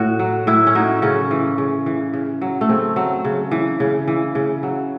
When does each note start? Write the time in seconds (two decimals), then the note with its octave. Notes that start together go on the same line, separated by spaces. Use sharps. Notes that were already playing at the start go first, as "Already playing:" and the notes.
Already playing: A2 F#4
0.19 F#3
0.47 A2 E4
0.67 C#4
0.75 F#3 D#4
1.02 C#3 C#4
1.31 E3
1.58 C#3
1.86 E3
2.14 C#3
2.41 F#3
2.61 A3
2.69 C#3 C4
2.96 F#3
3.25 C#3
3.51 E3
3.80 C#3
4.08 E3
4.35 C#3
4.63 F#3